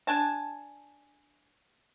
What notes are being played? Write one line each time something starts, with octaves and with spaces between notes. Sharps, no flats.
D4 G#5 A5